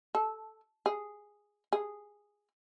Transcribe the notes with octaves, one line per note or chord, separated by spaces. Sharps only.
A4
G#4
G#4